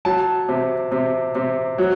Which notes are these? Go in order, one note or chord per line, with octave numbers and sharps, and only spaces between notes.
F#3 A5
C3
C3
C3
F#3